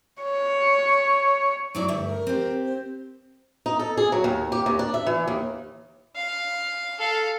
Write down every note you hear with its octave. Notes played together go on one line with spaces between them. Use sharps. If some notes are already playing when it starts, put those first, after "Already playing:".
C#5
F#3 E4 D5 C#6
D2 G2 E5
A#4
C4 G4
C5
D#4
A4
G#4
F#3
D#2
G4
D#2
D4
E5
E3
D#2
F5
A4 F5